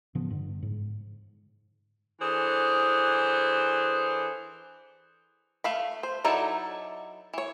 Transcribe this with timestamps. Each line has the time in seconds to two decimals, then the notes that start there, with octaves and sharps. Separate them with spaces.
0.15 A2 C#3 F3 B3
0.30 G2 D3
0.62 G#2
2.21 E3 D4 G#4 A4 C5
5.64 A3 F5 B5
6.03 C5
6.24 F#3 D#4 E4 A4 D5
7.34 E3 C#5